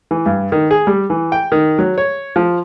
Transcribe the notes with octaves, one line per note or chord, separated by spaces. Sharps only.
E3
G2
D#3
G#4
G3
E3
G5
D#3
F#3
C#5
F3